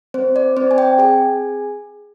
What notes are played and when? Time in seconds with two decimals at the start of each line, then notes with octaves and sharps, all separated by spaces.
0.14 C4 C5
0.36 D5
0.57 C4 C5
0.71 G#5
0.78 G5
0.98 G#4 G#5